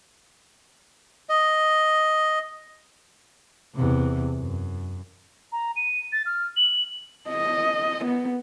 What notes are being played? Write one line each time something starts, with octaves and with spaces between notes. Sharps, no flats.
D#5
E2 C3
F#2
A#5
D#7
A6
F6
F#7
D#5
B3